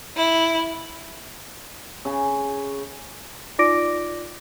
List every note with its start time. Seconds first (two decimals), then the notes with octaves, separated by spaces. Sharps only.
0.16 E4
2.05 C#3
3.59 D#4 F4 D5 D6 A#6 D7